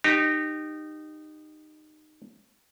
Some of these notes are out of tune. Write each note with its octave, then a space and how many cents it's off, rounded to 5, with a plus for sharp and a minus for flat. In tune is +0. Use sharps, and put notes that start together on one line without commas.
D#4 -20 G4 +0